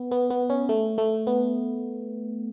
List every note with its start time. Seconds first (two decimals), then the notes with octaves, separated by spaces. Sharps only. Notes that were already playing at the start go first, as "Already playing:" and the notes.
Already playing: B3
0.11 B3
0.30 B3
0.50 C#4
0.69 A3
0.98 A3
1.27 B3